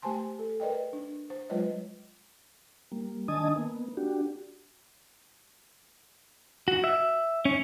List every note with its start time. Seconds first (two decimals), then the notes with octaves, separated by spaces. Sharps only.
0.02 A3 G4 C5 G#5 A5 C6
0.39 A4
0.60 A#4 B4 D5 D#5 G5
0.93 D4
1.30 C5
1.49 F#3 G#3 F4 B4 C#5 D#5
2.92 G3 A#3
3.28 D#3 D4 D#5 G#5 A5 D#6
3.56 A#3 B3
3.97 D4 F#4 G4
6.68 F#4
6.84 E5
7.45 C#4